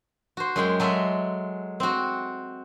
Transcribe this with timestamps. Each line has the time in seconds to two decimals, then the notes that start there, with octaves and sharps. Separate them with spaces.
0.37 F#4 C5
0.56 F#2 G#3 G5
0.80 F#3 G#3 A4 D#5 E5
1.80 C4 F#4